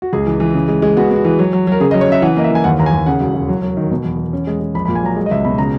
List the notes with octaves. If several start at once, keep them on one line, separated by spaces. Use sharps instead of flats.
F#4
C#2 G#4
E3
E3
C#3
G#3
G#3
B3 F#4
B3
F#4
E3
F#3
F#3
F#3 A#4
C#3 G#4
D#5
F#3
C#5
C#3 E5
E3 F#5
A#3 D#5
E5
E3 G#5
D#2 F#5
D#2 A#5
G#5
D#2
C#3 F#5
E1
E1
F#3
F#3
D#3
B2
E2
E2
C#4
G#3
G#3
A#1 B5
B5
A#2
G#5
F#3 A#5
G#3
D#5
C#2 E5
B2 B5
C#3 A#5